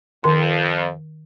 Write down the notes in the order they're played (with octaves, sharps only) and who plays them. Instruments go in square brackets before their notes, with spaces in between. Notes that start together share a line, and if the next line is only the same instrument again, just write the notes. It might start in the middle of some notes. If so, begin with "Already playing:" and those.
[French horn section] F2 [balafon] D#3 C6